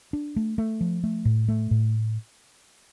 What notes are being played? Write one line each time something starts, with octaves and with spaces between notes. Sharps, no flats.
D4
A3
A3
F3
A3
A2
A3
A2